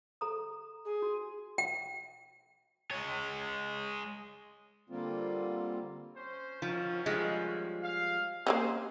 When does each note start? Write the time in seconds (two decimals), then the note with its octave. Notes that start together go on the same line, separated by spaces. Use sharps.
0.21 A4 A#5 D#6
0.85 G#4
1.02 F#4
1.58 G5
2.91 G#3 C#5
4.90 D3 G3 A#3 C4 F4
6.16 C#4 C5
6.62 D#3 F3 F#3 C#4
7.06 F3 G3 G#3
7.83 F5
8.47 A#3 C4 C#4 G#4 C5